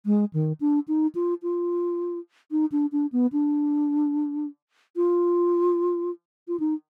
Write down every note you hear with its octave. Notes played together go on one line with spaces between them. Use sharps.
G#3
D#3
D4
D#4
F4
F4
D#4
D4
D4
B3
D4
F4
F4
D#4